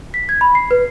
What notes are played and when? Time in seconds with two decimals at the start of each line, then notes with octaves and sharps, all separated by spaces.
0.14 B6
0.29 G#6
0.41 B5
0.55 C7
0.71 B4